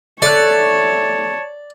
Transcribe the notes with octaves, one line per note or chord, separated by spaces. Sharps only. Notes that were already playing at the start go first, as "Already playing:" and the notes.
A3 C#5 D5 A5 D6 F#6